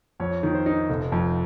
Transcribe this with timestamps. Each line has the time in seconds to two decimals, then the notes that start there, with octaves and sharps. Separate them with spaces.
0.20 F2 C#5
0.43 D#3
0.55 C5
0.66 D#4
0.89 F1
1.12 F2